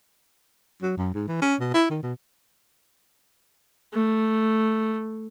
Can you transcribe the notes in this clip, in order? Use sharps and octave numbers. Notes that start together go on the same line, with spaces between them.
F#3
F#2
G#2
E3
C#4
B2
E4
D#3
B2
A3